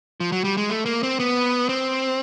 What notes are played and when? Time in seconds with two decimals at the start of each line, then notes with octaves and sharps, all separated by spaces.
0.20 F3
0.32 F#3
0.44 G3
0.57 G#3
0.70 A3
0.86 A#3
1.03 C4
1.20 B3
1.69 C4